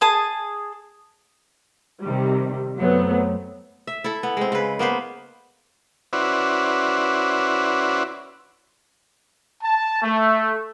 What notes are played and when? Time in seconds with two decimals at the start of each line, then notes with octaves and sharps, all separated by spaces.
0.01 G#4 A5 D#6
2.01 C3 D#3 G3
2.77 F#2 F#3 A3 B3 C4
3.87 E5
4.04 E4 A4
4.23 B3
4.37 G#3 C4
4.52 C#3 B4
4.79 A#3 B3 B4 C5
6.13 C#4 E4 F#4 B4 C5 D5
9.63 A5
10.03 A3